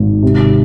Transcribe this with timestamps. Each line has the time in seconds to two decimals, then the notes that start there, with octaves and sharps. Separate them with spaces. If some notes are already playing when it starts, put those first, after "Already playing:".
Already playing: G#1 G#2
0.22 C3